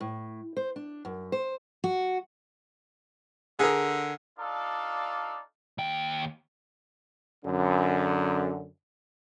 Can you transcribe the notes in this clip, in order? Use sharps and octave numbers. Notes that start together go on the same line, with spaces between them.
A2
C5
D4
F#2
C5
F#4
D3 G#4 A#4
D4 D#4 F4 A4 D5 F5
D#2 G5
F#2 D3